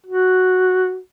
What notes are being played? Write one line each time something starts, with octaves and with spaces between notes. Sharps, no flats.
F#4